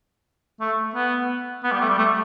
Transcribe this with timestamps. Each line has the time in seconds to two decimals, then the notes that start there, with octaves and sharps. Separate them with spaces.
0.61 A3
0.95 B3
1.64 B3
1.72 G3
1.81 A3
1.89 G3
1.98 A3